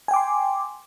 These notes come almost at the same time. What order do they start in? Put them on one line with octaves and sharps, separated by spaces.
G#5 G5 D6 C6